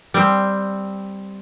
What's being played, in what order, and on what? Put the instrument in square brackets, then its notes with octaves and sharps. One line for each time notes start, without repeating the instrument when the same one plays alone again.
[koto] G3 C4